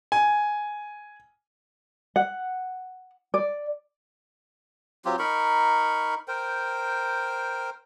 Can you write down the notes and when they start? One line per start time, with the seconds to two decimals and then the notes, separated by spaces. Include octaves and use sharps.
0.12 G#5
2.16 F#5
3.34 D5
5.05 F#3 C4 F4 G4
5.19 D#4 A#4 B5 C#6
6.28 A#4 C5 G5